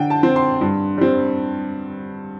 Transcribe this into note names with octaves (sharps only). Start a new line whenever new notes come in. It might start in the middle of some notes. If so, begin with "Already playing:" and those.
Already playing: D3 G5
A5
C4
C6
G2
G3 C4